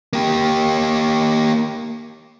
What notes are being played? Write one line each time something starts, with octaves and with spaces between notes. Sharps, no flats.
A#3 G4